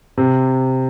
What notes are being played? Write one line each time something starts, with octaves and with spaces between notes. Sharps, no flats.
C3